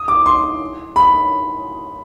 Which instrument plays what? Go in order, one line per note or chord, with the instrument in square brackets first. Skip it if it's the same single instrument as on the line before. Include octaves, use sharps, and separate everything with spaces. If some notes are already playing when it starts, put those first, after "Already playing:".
Already playing: [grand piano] D#6
D6
C6
B5